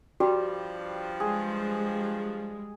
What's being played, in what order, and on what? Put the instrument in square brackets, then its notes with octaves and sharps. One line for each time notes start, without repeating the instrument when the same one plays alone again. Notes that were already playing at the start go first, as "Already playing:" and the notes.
[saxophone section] G2 F3 [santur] G3 [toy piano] F#4
[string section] G3 G#3 [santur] G#4